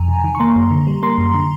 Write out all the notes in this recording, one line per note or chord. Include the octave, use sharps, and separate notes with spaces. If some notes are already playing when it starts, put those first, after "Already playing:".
Already playing: F2 G#5 A#5
C3
D#3
C#6
A#3 A#5 C6
F#2
D3
G3
A#3 A#5 C6
F#2
D3